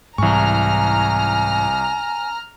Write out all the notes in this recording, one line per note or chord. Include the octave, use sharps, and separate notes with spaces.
C2 G#2 E3 G#5 A#5 C#6 F6